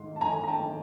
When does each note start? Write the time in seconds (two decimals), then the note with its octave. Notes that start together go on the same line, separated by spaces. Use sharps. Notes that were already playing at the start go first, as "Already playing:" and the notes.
Already playing: G#2 D#3 C6
0.16 A5
0.21 D#3 G#5 A#5
0.44 A#5
0.48 G5 A5
0.61 D#3